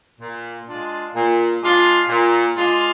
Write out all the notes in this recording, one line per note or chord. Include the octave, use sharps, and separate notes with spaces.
A#2
G#3 D4 F4
A#2
G#3 D4 F4
A#2
G#3 D4 F4